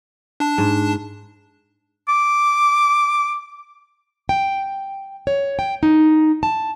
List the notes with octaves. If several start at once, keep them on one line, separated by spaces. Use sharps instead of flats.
D4 A5
G#2
D6
G5
C#5
G5
D#4
A5